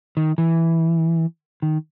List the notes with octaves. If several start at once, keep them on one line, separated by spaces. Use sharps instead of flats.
D#3
E3
D#3